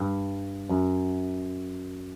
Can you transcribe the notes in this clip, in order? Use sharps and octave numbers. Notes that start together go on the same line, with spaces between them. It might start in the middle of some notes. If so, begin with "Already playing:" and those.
Already playing: G2
F#2